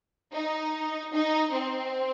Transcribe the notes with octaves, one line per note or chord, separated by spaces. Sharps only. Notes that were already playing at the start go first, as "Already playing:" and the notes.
D#4
D#4
C4